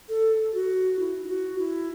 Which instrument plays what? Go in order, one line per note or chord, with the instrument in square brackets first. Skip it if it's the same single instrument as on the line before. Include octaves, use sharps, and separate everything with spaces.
[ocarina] A4
F#4
E4
E4
F#4
E4